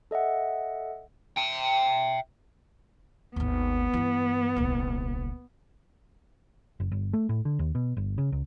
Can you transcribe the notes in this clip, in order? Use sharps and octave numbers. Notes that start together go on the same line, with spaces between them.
A4 D#5 E5 F#5
E5 G5
G#1 D#2 B3
G2 E3
D#1 C2
F#1
G1
A3
A2
D3
D#2
B2
G1
C#3
C#2